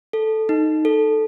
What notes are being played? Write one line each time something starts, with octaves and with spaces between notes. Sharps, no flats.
A4
D#4
A4